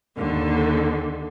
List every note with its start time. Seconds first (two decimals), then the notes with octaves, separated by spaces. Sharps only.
0.17 D#2 D3